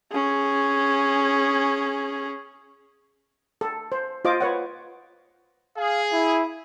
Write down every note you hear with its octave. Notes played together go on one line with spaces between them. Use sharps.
C#4 G#4
A4
C5
F4 C5 D#5 D6
B4 C#5 F#5
G#4 F5
E4